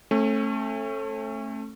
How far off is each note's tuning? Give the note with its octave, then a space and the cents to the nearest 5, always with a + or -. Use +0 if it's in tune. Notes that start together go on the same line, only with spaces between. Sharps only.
A3 +0 C#4 -40